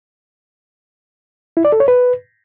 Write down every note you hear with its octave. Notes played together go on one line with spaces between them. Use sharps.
E4
D5
A4
C#5
B4